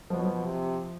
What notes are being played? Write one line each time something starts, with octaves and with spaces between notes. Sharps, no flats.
B2 F3
F#3
F3
C3